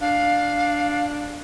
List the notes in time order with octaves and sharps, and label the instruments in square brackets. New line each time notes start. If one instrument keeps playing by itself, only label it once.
[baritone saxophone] D4 [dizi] F5